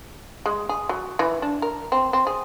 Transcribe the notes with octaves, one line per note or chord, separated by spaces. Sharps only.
G#3
G#4
F#3
E3
D4
A#4
C4
C4
G#4